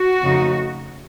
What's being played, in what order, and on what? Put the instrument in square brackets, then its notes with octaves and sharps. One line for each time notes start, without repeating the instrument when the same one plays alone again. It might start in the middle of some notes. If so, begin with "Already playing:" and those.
Already playing: [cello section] F#4
F2 C#3 A3 D#4